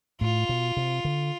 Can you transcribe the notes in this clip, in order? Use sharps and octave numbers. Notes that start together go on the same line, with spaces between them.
A2 F4
B2
C3
D3